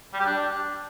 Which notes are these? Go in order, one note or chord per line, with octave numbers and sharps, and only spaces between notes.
G3
G4
D4